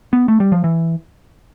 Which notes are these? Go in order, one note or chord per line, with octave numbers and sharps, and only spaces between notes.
B3
A3
G3
F3
E3